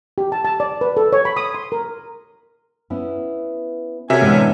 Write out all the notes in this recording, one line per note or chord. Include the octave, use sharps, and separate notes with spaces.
G4
A5
A5
D5
B4
A4
C#5
B5
D#6
C6
A#4
B3 C#4 E4
C3 C#4 F#4 A4 A#4 E5 G#5
A2 D3 E3 G#3 B3